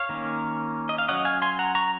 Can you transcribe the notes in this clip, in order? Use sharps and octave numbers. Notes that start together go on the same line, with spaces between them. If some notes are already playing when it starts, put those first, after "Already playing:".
Already playing: C#5 F5
D#3 A#3 C#4
D#5
F5
F#3 C#4 D#5 F#5
F5 G#5
G#5 C6
F#5 A#5
A#5 C#6